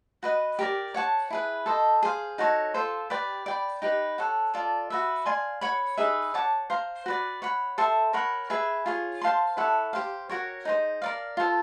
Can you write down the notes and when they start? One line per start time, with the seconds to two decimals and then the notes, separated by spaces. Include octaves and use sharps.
0.23 F#4 B4 D#5
0.59 G4 A#4 D5
0.94 C#5 F#5 A5 C#6
1.30 E4 G#4 B4
1.66 A4 C5 D#5
2.03 G#4 C5 F5
2.38 D#4 F#4 A4 C#5
2.74 F4 A4 C5
3.10 G4 B4 D5 G5
3.46 D5 G5 B5
3.82 D#4 G4 B4
4.18 A4 C#5 F#5
4.54 F4 A4 D5
4.90 F#4 B4 E5
5.26 D5 F5 G#5 C6
5.61 C#5 F#5 B5
5.98 D#4 G#4 B4 E5
6.34 C#5 F#5 A5 D6
6.70 C5 F5 A#5
7.06 F#4 B4 D5
7.42 C#5 F#5 B5
7.78 A4 C5 E5 G5
8.13 A#4 C#5 F#5 B5
8.50 G#4 B4 E5 G#5
8.86 F4 G#4 C#5
9.22 C5 F5 A5 C6
9.57 E4 A4 C#5 F#5
9.93 G4 C5 F5
10.29 F#4 A#4 C#5
10.65 D#4 G#4 C5
11.02 A#4 D5 F5
11.37 F4 A4 C5